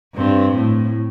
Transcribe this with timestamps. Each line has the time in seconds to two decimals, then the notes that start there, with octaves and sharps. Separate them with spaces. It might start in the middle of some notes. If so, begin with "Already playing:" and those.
0.15 G2 C4
0.54 A2